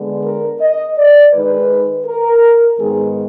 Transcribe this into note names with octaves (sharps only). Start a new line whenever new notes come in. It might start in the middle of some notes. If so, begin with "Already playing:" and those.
Already playing: D3 G#3 B3 D4
A#4
D#5
D5
D#3 G#3 D#4 B4
A#4
G#2 D#3 G#3 B3 D#4 G#4